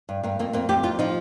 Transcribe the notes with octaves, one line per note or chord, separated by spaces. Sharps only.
G2
G2 A#3
F2 A#3
F2 A#3
F2 G4
F2 F4
F3 D#4